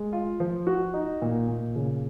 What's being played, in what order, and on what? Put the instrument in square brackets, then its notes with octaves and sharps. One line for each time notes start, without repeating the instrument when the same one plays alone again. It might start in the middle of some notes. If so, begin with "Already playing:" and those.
Already playing: [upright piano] G#3
F4
F3
F#4
D#4
A#2
A#2
C#3